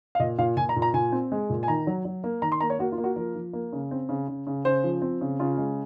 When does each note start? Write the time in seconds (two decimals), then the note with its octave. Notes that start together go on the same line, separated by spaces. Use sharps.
0.15 F5
0.20 A#2 D#5
0.38 A#2 F5
0.57 A#2 G#5
0.69 A#5
0.76 A#2
0.82 A#5
0.94 A#2 G#5
1.12 C4
1.32 G#3
1.50 A#2
1.63 G#5
1.68 D#3 A#5
1.87 F#3
2.05 F#3
2.24 A#3
2.42 D#3 A#5
2.52 C6
2.61 A#3 A#5
2.70 C#5
2.79 A#3 F#4
2.92 F4
2.98 A#3
3.04 F#4
3.16 F3 A#4
3.36 F3
3.53 A#3
3.73 C#3
3.91 C4
4.09 C#3
4.28 C#3
4.47 C#3
4.65 C#3 C5
4.84 F3
5.02 C4
5.21 C#3
5.39 C#3 F4
5.58 G#3